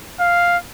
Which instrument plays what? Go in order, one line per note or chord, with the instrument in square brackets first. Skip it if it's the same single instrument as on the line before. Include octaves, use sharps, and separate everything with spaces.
[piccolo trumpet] F5